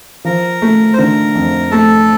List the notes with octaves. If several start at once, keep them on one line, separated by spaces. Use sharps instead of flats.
F3 A#4
A3
C5
D3 A#4
F2
A3 A4